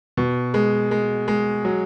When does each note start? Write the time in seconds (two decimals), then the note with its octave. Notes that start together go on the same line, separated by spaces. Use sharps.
0.17 B2
0.54 G#3
0.91 G#3
1.28 G#3
1.65 F#3